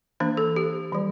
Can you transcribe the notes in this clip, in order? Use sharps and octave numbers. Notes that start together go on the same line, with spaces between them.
E3 A#3 D4 C5
A4
G4
E3 G3